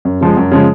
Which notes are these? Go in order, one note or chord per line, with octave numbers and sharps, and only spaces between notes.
F#2
C#3 F3 G#3
F#2
C#3 F3 G#3